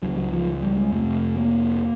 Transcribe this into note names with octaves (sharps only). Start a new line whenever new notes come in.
C#2 C#3 F#3
F#3
F3
G3
G#3
F2 C3 A3
A#3